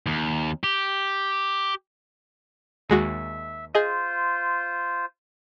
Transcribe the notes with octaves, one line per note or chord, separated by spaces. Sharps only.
D#2
G4
D#2 G#3 F#4 E5
F4 G#4 C5 D#5